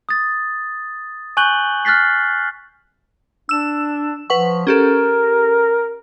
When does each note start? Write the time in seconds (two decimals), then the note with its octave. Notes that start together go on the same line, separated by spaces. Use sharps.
0.09 D#6 A6
1.37 G#5 C#6 F#6 G6 F#7 G7
1.85 F6 F#6 A6 B6 C7
3.49 D4 E6 E7
4.30 F3 B4 F#5 C#6
4.67 C#4 G4 A4 A#4